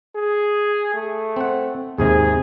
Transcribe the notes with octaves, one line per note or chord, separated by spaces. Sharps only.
G#4
A3
C4 F#5
D#2 G#2 C3 G#4